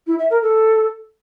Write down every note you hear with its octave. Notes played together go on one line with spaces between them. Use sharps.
E4
E5
A#4
A4